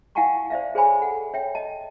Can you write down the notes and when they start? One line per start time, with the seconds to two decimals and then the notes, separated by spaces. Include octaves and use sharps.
0.15 E4 F5 F#5 G#5 A5 C#6
0.50 C5 D5 E5 F5
0.75 G#4 C5 C#5 G#5 B5
1.01 A4 F#5
1.34 C#5 E5 G5
1.55 D#5 A5